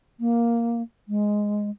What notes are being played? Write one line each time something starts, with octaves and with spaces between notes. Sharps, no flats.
A#3
G#3